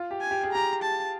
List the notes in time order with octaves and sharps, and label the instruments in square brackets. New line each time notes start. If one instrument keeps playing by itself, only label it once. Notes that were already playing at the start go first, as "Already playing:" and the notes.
Already playing: [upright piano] F4
G4
[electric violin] G#5
[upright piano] G4
G#4
[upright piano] G4 [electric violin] A#5
[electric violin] A5